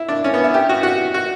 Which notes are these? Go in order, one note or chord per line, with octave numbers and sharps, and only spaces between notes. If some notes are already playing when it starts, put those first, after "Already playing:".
Already playing: E4
D4
C#4
B3
E4
G4
F#4
F#4
F#4